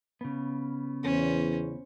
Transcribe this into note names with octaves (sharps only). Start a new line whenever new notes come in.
C#3 B3
E2 C#4 C5